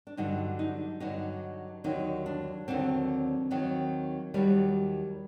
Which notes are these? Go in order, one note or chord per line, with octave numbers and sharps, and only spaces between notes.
D4
G2 D3 F#3 D#4
D#4
G2 D3 F#3 D#4
D#2 D3 F#3 D#4
D4
D#2 D3 F#3 C4
D#2 D#3 F#3
D#2 D#3 F#3 G3